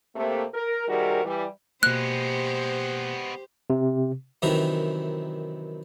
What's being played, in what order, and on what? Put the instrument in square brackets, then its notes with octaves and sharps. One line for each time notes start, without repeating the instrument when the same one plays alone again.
[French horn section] C3 A3 A#3
A#4
C3 D#3 G3 F#4 G#4 A#4
E3 G3
[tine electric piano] B2 A#3 [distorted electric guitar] G#3 B3 [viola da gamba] G4 C5 [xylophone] F#6
[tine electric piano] C3
[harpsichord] F#2 C3 D#3 E3 A#4 A#5